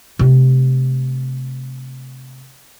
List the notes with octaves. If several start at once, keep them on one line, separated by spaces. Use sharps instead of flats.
C3 A3